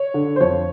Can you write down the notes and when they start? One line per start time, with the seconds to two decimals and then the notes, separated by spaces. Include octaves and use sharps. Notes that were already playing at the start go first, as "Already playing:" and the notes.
Already playing: C#5
0.14 D3
0.36 C5
0.41 F2 C#5